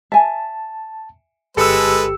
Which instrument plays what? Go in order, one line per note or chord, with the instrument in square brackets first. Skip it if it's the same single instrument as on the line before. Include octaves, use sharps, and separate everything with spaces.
[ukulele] E5 G#5 [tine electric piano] A5
[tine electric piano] G1 G4 C#7 [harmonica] G#3 B4 [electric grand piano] A4 E6